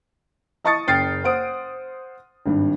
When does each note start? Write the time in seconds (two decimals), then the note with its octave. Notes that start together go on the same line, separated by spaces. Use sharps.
0.64 D#5 A5 C#6 D#6 A6 C#7
0.87 F#1 G5 F6 A6 C7
1.24 C5 F#5 D#6 D7
2.46 G#1 G2